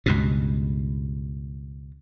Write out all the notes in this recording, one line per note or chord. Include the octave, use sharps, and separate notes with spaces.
C#2 G2 B2